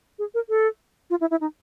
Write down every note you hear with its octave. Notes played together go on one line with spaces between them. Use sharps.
G#4
A#4
A4
F4
E4
E4
D#4